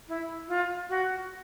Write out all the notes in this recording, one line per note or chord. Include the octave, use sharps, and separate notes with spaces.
E4
F4
F#4